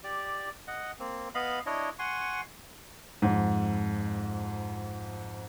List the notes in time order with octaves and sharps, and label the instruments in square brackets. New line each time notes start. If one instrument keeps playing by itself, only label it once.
[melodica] G4 D5
D#5 F#5
A#3 C4
B3 D#5 F5 B5
D4 E4 C#5 D#5
F#5 G#5 C6 C#6
[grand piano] F2 G#2